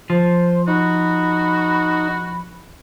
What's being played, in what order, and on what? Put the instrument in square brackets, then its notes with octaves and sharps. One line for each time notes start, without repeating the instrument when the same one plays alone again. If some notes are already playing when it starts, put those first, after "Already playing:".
[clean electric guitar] F3 [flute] C5
[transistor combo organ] D#4 [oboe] F#4 [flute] B5